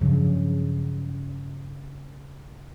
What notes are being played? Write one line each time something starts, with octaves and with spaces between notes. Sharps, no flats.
G2 C#3 F3 F#3